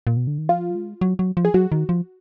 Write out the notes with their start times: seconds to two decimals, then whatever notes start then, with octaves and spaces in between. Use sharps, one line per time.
0.07 A#2
0.17 B2
0.27 D3
0.38 D#3
0.49 F3 F4
0.70 F#3
0.75 G#3
1.01 F#3
1.19 F#3
1.37 F3
1.45 G#4
1.54 F#3 F#4
1.72 D#3
1.89 F3